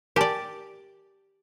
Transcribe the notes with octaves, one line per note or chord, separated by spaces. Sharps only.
G4 A#4 D5 G#5 A5